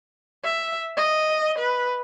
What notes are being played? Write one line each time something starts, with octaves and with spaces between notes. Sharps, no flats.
E5
D#5
B4